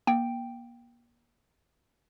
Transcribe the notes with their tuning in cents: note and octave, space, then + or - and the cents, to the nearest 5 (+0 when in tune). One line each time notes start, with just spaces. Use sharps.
A#3 +35 G5 +0